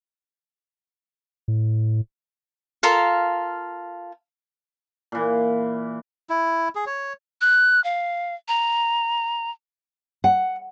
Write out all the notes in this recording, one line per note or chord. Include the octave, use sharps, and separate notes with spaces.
A2
F4 A4 A#4 F5
A#2 E3
E4
G#4
C#5
F#6
F5
A#5
F#5